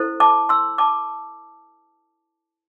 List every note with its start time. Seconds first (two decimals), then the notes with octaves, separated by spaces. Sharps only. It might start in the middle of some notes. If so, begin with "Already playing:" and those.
Already playing: E4 A4 C5
0.20 A5 D6
0.49 C6 E6
0.78 A5 D6